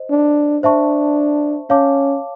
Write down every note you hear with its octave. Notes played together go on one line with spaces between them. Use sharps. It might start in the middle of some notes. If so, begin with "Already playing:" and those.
Already playing: C5 D#5
D4
D4 C5 E5 A5 C#6
C#4 C#5 F5 A5 D6